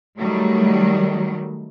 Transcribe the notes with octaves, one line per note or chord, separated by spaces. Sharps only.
D#3 F#3 G3 A3